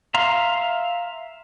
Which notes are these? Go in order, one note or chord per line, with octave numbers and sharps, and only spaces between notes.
E5 F5 A#5 C6